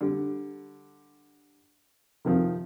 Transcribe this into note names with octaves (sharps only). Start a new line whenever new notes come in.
D3 G3
C3 D#3 F3